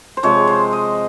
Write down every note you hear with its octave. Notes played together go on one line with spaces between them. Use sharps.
C5
C3 F3 G#3 C#5
C5
D#5